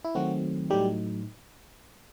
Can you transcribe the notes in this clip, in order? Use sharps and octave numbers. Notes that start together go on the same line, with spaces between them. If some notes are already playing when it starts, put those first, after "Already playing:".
E4
D#3 F#3 A3 C4 F#4
A2 F#3 G3 A3 D#4 G4